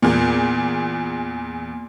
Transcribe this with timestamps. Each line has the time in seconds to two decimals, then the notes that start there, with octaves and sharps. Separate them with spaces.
0.02 E2 A#2